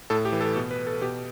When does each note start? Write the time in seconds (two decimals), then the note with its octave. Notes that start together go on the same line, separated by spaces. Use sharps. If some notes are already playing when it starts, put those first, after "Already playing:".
0.10 A2 A4
0.25 G4
0.32 E3
0.41 A4
0.56 B2
0.71 B4
0.87 A4
1.02 B2 G4